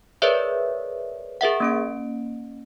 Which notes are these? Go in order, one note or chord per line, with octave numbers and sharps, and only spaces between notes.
G#4 A#4 B4 C#5 D5 E5
G#4 A#4 E5 F#5
A#3 C#4 D7